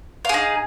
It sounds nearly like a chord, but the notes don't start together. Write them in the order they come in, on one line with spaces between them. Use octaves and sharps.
F5 G#4 D#4